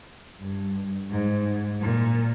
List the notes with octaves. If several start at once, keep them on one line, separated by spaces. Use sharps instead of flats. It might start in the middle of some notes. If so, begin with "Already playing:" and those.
G2
G#2
A#2